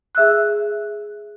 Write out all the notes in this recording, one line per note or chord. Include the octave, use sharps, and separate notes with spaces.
G#4 E5 E6 F#6